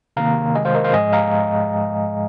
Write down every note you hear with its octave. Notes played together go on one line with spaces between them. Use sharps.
C3 D#3 A#3 F5 A#5
C3 D#3 G#3 D#5 G#5
C5 F5
A#4 D#5
C5 F5
G#2 F3 G#3 D#5 G#5
F5 A#5